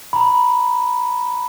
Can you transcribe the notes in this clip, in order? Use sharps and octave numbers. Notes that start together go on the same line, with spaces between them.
A#5 B5